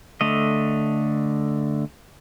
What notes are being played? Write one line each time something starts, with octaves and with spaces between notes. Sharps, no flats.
D3 A3 D#5